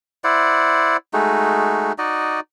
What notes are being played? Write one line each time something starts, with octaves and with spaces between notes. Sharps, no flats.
E4 C5 D5 F#5
G#3 A3 D#4 F#4
D#4 F#4 D5 D#5